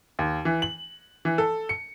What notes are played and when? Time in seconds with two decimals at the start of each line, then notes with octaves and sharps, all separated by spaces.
0.19 D#2
0.45 E3
0.62 F#7
1.25 E3
1.38 A4
1.69 C#7